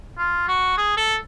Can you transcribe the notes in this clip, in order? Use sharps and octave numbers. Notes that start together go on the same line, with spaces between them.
F4
F#4
G#4
A4